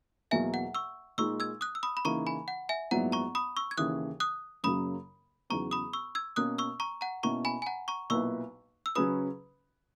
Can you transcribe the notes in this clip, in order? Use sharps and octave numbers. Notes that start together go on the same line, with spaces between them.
E2 B2 F#3 A#3 E5 G#5
F#5
C#6 E6
A#2 G#3 D#4 C#6 E6
E6 G#6
D#6 F#6
E6
B5 D#6
B5
C#3 E3 A#3 D#4 A#5 C#6
G#5 B5
F#5
E5 G#5
A#1 G#2 F#3 B3 E4 F#5 A#5
A#5 C#6
B5 D#6
C#6 E6
G#6
D#2 C#3 E3 D#6 F#6
D#6 F#6
F#2 C#3 F#3 A#3 B5 D#6
E2 C#3 F#3 B3 A#5 C#6
B5 D#6
C#6 E6
E6 G#6
B2 A#3 C#4 D#6 F#6
C#6 E6
A#5 C#6
F#5 A#5
B2 A#3 C#4 E4 A#5 C#6
G#5 B5
G#5
F#5 A#5
A#5 C#6
B1 A#2 A#3 E4 B4 C#6 E6
E6
C#3 F#3 C#4 G#4 B4 B5 D#6